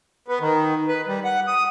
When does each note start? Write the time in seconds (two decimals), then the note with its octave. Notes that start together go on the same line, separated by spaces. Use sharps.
0.28 B3
0.41 D#3
0.88 B4
1.07 G3
1.24 F#5
1.47 D#6